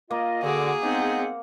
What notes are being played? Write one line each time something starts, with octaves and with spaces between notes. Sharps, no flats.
A#3 F4 D#5
D3 F#4 G#4 D6
G#3 B3 C4 D#4 F#5